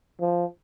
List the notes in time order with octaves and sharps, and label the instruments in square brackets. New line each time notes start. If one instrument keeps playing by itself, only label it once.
[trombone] F3